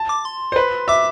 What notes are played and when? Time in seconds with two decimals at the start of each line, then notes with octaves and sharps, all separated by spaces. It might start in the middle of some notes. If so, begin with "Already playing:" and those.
Already playing: A5
0.09 D6
0.25 C6
0.52 C5
0.56 B4
0.88 E5 D6